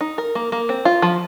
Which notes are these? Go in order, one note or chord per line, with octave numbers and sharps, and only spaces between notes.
D#4
A#4
A#3
A#3
C4
F4
F3